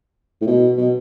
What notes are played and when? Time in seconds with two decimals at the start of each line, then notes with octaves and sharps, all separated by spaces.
0.41 A2
0.47 B2
0.77 B2